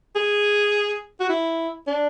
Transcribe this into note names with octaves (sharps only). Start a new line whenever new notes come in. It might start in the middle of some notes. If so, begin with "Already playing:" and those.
G#4
F#4
E4
D4